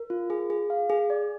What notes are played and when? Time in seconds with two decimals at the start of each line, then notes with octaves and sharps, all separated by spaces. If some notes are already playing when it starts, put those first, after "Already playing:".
Already playing: A#4
0.10 F4
0.30 G#4
0.50 G#4
0.70 F5
0.90 G#4
1.10 D5